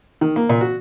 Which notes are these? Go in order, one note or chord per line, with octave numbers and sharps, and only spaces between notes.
D#3
A#3
A#2
F#4